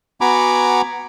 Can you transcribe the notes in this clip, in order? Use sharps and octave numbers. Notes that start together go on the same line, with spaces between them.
B3 F#4 G#5 A#5 B5 D6